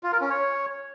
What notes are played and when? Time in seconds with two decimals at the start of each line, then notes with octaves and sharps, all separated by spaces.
0.03 F4
0.12 A#4
0.21 C#4
0.30 C#5